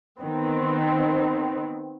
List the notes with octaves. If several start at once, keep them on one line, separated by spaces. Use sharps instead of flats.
D#3 B3 C4